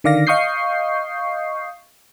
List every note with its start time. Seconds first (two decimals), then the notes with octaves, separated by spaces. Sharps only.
0.04 D3 D#3 D5 F5 A#6
0.27 D#5 F5 C#6 D#6 G6 C7